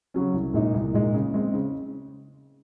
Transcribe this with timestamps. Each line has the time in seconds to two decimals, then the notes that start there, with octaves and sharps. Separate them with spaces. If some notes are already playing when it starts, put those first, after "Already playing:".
0.14 C#3 F#3 C#4
0.34 C2
0.54 A#2 G#3 D#4
0.74 C2
0.94 A#2 G#3 D#4
1.14 C#3
1.34 G#3 C4
1.54 C#3